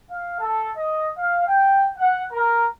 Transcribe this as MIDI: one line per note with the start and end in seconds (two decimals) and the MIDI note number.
0.10 0.38 77
0.41 0.70 69
0.77 1.08 75
1.18 1.44 77
1.48 1.88 79
1.97 2.23 78
2.32 2.68 70